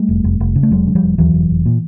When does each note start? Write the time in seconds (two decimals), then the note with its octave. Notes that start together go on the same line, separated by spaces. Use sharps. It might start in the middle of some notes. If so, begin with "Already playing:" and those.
Already playing: G3 A3
0.08 F1
0.24 F1
0.40 F1
0.56 C#3
0.63 A3
0.71 F1 F#3 G#3
0.87 C#3
0.95 F3 G3
1.03 F1
1.18 D#2 E3 F#3
1.34 F1
1.50 F1
1.66 A#2